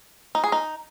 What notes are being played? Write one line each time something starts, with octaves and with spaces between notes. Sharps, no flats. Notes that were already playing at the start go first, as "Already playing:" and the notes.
D#4
G#4
D#4